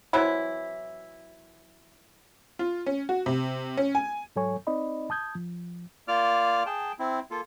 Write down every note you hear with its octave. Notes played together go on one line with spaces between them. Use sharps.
E3 F#3 C4 E4
F4
C#4
F#4
C3
C#4
G#5
G#2 F#3 A4 C#5 G#5 C#6
C4 D#4 D5 D#5 B5
A5 D#6 G6 G#6
F3
A#3 F4 D5 D6 F6
G#4 G5 A5
C4 E4
A#3 F4 A4